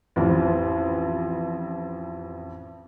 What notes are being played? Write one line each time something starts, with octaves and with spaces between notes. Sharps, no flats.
A1 F2